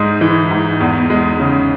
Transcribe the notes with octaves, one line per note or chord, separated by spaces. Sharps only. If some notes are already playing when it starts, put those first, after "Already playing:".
Already playing: G#2 G#3
E3
G#2
E2
G#3
C#3